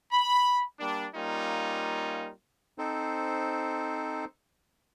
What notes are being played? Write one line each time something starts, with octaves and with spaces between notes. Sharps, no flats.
B5
G3 A#3 D4
G3 A#3 C#4 D#4 F4
C4 D#4 A4 C5